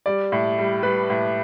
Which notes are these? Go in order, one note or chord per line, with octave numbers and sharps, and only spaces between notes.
G3 D5
A2
G3
G3 B4
A2